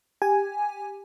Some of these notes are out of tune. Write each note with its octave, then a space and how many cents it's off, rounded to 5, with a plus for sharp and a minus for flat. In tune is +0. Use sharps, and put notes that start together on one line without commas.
G4 +15 G#5 +0